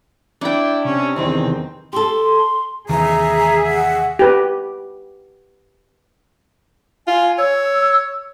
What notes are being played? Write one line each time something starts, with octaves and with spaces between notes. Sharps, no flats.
D4 E4 G5
C3 C#4
E2 D#3 E3 C4
G4 A4 C6
D#2 C3 E3 G#4 E5 A#5
F#5
G4 B4
F4 G#5
C#5 E6